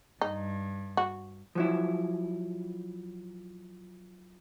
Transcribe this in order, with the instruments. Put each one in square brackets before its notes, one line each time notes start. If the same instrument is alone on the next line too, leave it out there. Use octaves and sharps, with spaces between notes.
[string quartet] G2 [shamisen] D#4
[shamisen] F#4
[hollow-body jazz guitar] F3 F#3 E4